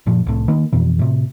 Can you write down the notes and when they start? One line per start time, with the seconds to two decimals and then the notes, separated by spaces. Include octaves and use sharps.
0.06 F#1 A#2 F3
0.26 C2 A2
0.48 D#3 A#3
0.73 F2 B2 E3
0.99 A2 C3